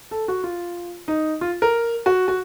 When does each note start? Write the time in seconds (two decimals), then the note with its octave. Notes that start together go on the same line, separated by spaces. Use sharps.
0.11 A4
0.28 F#4
0.44 F4
1.08 D#4
1.41 F4
1.62 A#4
2.06 F#4
2.28 F#4